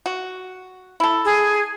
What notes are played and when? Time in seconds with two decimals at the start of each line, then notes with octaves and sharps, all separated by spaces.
0.06 F#4
1.00 E4 A4
1.25 G#4